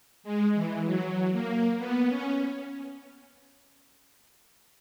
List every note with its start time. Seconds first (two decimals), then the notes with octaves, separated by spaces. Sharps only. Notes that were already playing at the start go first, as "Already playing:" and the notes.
0.24 G#3
0.55 E3
0.85 F#3
1.32 A#3
1.78 B3
2.09 C#4